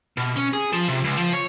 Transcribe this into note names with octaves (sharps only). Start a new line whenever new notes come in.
B2
C#4
G#4
F3
C3
C#2
F3
C#5